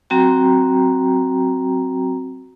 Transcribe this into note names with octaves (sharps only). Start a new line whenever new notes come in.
F#3 C4 F#4 G5 A#5